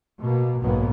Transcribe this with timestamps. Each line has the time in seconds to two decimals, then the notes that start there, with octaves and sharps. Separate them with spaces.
0.19 B2 A#3
0.62 F#1 B1 G#2 B2 A#3 B3